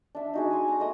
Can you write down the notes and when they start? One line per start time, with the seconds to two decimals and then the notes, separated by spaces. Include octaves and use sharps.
0.15 D4 E5
0.34 D#4 F#4 G#4
0.51 G#5 C6
0.68 A#5
0.80 A3 D#5 D#6